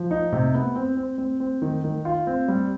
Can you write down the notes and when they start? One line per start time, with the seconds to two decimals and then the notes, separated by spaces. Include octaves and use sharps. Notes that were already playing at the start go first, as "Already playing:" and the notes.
Already playing: F3
0.11 D#4
0.32 C3
0.54 B3
0.76 C4
0.97 C4
1.18 C4
1.40 C4
1.62 D#3
1.84 D#3
2.05 F4
2.27 C4
2.48 G3